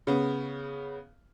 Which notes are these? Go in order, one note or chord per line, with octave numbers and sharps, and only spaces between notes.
C#3 B3